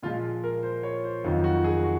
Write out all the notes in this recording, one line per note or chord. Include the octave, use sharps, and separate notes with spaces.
A#2 F3 G#3 F4
A#4
C5
C#5
C5
F2 D#3 F#3 F4
F#4
G#4
F#4